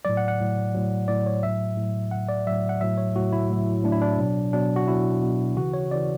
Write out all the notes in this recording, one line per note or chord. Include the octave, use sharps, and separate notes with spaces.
A2 F#3 D5
F#5
F#5
A2 F#3
A2 F#3
A2 F#3 D5
C#5
A2 F#3 E5
A2 F#3
A2 F#3 F#5
D5
A2 F#3 E5
F#5
A2 F#3 E5
C#5
A2 F#3 F#4
E4
A2 F#3
A2 F#3 D4
E4
D4
B2 F#3
B2 F#3 D4
F#4
B2 F#3 E4
B2 F#3
C#3 E3 F#4
C#5
C#3 E3 D5